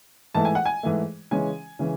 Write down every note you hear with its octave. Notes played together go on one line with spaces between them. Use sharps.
G#2 E3 A3 A5
G#5
F#5
G#5
G#2 E3 A3
C#3 E3 G#3 C#4 G#5
C#3 E3 G#3 C#4